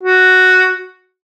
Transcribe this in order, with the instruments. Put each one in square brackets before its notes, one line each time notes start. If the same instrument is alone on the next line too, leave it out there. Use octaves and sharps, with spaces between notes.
[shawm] F#4